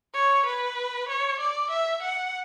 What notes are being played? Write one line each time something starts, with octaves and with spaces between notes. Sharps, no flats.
C#5
B4
C#5
D5
E5
F#5